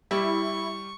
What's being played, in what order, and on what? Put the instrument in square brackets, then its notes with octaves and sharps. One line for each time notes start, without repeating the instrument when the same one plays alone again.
[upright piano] G3 [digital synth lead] E4 [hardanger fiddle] C#6